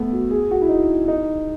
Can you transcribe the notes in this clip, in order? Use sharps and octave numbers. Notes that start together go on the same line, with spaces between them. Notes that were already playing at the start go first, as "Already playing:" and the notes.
Already playing: A3 B3
F#4
G#4
F#4
E4
D#4
D#4